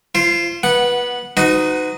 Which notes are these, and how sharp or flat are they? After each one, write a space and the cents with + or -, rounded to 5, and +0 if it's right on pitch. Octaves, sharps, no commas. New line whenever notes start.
F4 -35 C5 +0
B3 -20 F#5 +0
D#4 +0 F#4 +0 B4 +45